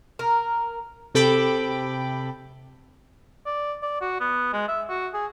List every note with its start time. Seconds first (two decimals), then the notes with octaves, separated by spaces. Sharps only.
0.19 A#4
1.15 C3 A4 G5 B5 D6
3.46 D5
3.82 D5
4.01 F#4
4.20 B3
4.53 G#3
4.68 E5
4.89 F#4
5.14 G#4